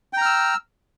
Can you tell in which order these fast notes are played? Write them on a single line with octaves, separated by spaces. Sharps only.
G5 A#5 F6 E6